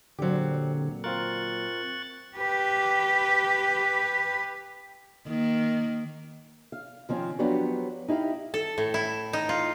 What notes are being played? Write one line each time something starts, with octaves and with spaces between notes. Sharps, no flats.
A#2 D3 F#3 C4 G4
C4 F4 A#4 C#6 F#6 A6
G4 B4
D#3 A#3
F5
D#3 F3 C4 C#4
F3 F#3 B3 D4 G4 C#5
D#4 E4 G4 F5
A4
A2
E4
D#4
F4